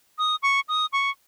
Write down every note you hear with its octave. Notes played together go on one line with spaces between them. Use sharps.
D#6
C#6
D#6
C#6